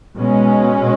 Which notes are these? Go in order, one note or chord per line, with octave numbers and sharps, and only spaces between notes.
B2 G#3 C#4